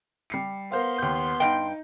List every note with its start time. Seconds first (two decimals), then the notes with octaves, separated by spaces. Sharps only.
0.30 G3 C7 C#7
0.72 B3 A#4 C5 F5 C6
0.98 D#2 G6
1.40 G2 D#4 G5